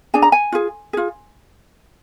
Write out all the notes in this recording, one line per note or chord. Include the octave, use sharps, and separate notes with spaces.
D4 G#4 G#5
A#5
G#5
F4 G#4
F4 G#4